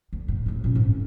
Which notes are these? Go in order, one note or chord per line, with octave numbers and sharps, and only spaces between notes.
D2
A2
C2 A2
A#2 C#4
G#2
F2